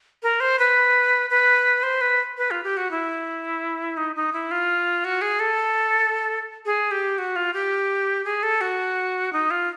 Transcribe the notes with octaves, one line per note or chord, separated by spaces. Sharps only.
A#4
C5
B4
B4
C5
B4
B4
F4
G4
F#4
E4
D#4
D#4
E4
F4
F#4
G#4
A4
G#4
G4
F#4
F4
G4
G#4
A4
F#4
D#4
F4